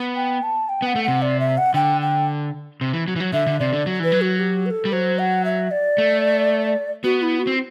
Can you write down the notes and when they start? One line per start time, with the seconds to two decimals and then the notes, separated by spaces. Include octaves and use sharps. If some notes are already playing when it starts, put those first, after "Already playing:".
Already playing: B3
0.16 G5
0.43 A5
0.69 G5
0.82 B3 F#5
0.96 A3
1.04 C3 F#5
1.22 D5
1.40 E5
1.58 F#5
1.74 D3 G5
2.01 G5
2.81 C3
2.93 E3
3.08 F#3
3.16 E3
3.20 F#3
3.33 D3 E5
3.47 D3
3.60 C3 D5
3.73 D3
3.86 F#3
4.00 E3 B4
4.12 F#3
4.22 F#4
4.39 G4
4.66 B4
4.71 A4
4.85 G3
4.92 F#3 C5
5.19 F#5
5.45 E5
5.71 D5
5.98 A3
7.04 B3 F#4
7.22 E4
7.40 F#4
7.47 C4